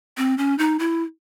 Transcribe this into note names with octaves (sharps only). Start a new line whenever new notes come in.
C4
C#4
D#4
E4